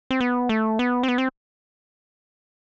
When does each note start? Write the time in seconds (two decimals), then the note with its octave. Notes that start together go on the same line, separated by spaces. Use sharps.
0.11 C4
0.20 B3
0.49 A3
0.79 B3
1.03 C4
1.08 B3
1.18 C4